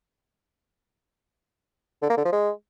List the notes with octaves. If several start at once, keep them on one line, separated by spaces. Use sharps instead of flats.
D3
A#3
D3
F3
G#3